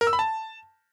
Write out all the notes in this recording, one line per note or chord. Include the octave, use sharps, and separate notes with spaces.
A#4
E6
B5
A5